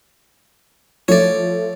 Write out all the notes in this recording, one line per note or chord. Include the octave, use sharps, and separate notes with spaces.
F3 A3 C#5 D5